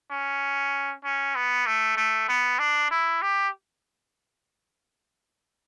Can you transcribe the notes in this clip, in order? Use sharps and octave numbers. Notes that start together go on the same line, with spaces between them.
C#4
C#4
B3
A3
A3
B3
D4
E4
G4